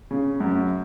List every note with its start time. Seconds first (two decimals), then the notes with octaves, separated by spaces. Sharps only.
0.11 C#3
0.40 F#2